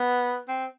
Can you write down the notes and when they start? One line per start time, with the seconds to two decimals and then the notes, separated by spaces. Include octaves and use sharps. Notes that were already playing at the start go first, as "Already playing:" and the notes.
Already playing: B3
0.48 C4